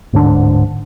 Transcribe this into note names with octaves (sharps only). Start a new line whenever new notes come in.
D1 G#2 D3 D4